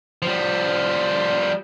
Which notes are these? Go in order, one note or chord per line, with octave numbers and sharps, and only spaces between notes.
F3 G3